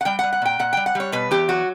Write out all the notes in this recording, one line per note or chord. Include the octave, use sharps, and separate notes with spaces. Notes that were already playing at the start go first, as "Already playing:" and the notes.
F#5
G3 G5
G3 F#5
F#5
A#2 G5
A#2 F#5
G3 G5
F#5
G3 C#5
B2 B4
E2 G4
F#3 F#4